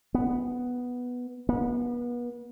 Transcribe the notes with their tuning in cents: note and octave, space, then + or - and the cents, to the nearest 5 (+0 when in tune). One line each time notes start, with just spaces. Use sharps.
B3 +0
B3 -35